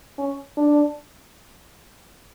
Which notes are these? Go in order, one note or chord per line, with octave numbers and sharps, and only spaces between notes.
C#4
D4